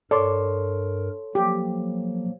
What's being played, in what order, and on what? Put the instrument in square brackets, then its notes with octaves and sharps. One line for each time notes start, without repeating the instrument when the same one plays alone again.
[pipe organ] G2 A#4 [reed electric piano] A4 C#5 C6 [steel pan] D5
[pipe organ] F3 F#3 A#3 [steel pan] G4